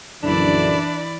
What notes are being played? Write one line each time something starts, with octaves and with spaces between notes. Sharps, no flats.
A#1 F#2 D3 E3 D4 E4 D5 B5